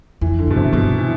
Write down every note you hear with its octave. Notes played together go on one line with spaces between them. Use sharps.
F2 E3
D3
G2 B2
C3
G2 B2
E3